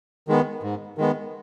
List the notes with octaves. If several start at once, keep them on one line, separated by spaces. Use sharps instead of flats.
D#3 G#3 B3
G#2
D#3 G#3 B3